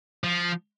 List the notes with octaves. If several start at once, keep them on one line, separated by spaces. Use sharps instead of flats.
F3